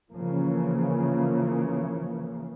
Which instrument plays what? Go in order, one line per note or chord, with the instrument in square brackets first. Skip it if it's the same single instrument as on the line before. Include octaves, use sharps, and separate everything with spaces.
[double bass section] C#3 E3 F3 A#3